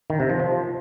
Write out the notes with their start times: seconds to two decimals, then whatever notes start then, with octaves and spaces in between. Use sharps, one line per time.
0.10 D#3
0.20 C3
0.30 F3
0.40 F3